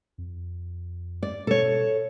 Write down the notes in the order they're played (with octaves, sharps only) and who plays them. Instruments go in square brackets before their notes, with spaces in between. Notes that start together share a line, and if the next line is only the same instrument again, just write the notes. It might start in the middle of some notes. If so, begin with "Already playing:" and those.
[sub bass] F2
[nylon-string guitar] D5
[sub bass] B2 [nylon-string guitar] A4 C#5